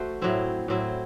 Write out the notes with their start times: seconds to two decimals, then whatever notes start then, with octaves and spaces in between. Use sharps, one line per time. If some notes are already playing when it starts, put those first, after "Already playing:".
Already playing: A3 F#4 C5
0.22 A2 F#3 C4 E4
0.68 A2 F#3 C4 E4